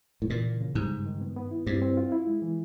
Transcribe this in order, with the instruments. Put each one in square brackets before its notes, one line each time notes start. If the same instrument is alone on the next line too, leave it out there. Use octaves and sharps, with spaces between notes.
[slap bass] A2
[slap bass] A#2 [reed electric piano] E3
[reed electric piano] C#3
C#3
[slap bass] G#2 [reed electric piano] G3
[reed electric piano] G2
D#3
B3
B3
E4
[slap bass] G2 [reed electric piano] C4
[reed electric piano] C4
F4
E4
G#3
E3